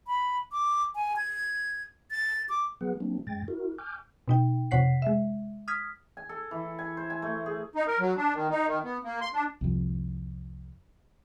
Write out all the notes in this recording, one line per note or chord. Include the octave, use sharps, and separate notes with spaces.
B5
D6
G#5
G#6
A6
D6
F#3 B3 G#4 B4 F#5
F#3 A#3 C4 D4
F#2 G#3 G5 A6
E4 F#4 A#4
G#5 D6 F6 G6
B2 D#4 G5
F2 C3 C#5 F#5 B6 C7
G#3 E5
D#6 F6 G#6 B6
G#5
A4
E3
G#5
C5
G#5
A3
G#4
D#4
A#4
F#3
D4
D#3
D#4
D#3
B3
A#3
C6
D4
C2 F2